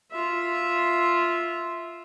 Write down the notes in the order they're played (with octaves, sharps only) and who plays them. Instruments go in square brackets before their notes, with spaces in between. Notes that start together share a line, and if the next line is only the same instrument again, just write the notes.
[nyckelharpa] F4 E5